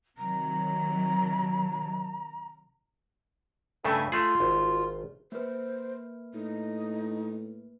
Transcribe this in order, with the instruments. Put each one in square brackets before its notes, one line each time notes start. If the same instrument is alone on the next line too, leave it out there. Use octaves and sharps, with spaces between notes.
[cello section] C3 D#3 F#3 [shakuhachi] A#5
[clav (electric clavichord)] G2 C#3 A3 [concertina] A4 E5 G#5
[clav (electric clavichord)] A3 G#4 [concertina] F4
[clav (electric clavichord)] G#1
[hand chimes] A#3 B4 [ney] C5
[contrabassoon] A2 [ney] D#4